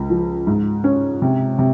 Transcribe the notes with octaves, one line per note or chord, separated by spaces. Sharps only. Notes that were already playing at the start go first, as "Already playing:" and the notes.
Already playing: C#2
F3
G#2
C#4
C3
C3